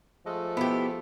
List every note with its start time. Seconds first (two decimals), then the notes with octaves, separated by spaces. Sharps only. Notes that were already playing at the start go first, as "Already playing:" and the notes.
0.25 F3 G#3 A3
0.57 B3 E4 G4